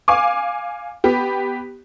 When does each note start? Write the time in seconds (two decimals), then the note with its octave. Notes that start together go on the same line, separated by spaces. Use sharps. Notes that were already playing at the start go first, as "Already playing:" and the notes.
0.08 F5 G#5 D6
1.04 B3 G4